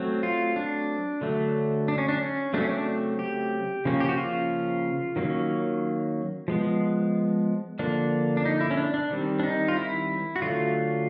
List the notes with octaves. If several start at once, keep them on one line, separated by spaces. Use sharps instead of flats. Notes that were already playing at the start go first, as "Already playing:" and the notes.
Already playing: F#3 A3 C4
F4
D4
D3 F#3 A3
D4
C#4
D4
C#4
C#3 F#3 A3 C4 D4
C#4
D4
G4
C#3 F3 A#3 C#4
G4
F#4
F4
D#3 F#3 A#3 C#4
F3 G#3 B3
D3 F3 A#3 D4
D4
D#4
E4
C#4
D4
D4
D#3 G3 C4
D4
D#4
F4
E4
F#4
D3 F#3 A3 F4